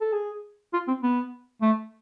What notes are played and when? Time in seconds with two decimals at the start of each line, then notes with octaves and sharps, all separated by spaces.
0.01 A4
0.13 G#4
0.73 F4
0.88 C4
1.03 B3
1.62 A3